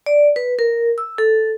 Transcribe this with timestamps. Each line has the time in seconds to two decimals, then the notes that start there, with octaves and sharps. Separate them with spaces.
0.06 D5
0.36 B4
0.59 A#4
0.98 E6
1.18 A4